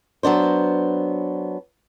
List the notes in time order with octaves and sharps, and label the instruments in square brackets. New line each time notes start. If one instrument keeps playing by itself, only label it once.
[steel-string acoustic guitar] F#3 B3 D4 C5